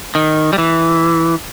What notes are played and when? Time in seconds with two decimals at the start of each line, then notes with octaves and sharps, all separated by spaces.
0.15 D#3
0.53 G3
0.58 E3